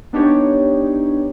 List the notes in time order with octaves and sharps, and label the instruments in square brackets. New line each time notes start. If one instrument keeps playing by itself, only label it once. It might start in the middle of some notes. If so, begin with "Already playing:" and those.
[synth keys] B3 D4 D#4 G4 C#5